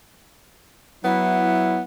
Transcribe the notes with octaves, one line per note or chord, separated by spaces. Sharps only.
F#3 B3 E4